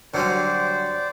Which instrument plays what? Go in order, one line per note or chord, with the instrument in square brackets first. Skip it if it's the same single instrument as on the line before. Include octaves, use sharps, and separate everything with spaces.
[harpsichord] D3 F#3 G3 [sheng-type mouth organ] C5 D5